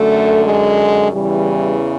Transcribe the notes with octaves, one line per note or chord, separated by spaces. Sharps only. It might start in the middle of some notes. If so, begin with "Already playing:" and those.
Already playing: F#2 D3 A3
G#3
E2 C#3 E3 G3